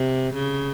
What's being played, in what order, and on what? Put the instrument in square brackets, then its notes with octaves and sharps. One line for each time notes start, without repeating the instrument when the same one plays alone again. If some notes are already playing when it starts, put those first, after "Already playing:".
Already playing: [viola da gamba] C3
C#3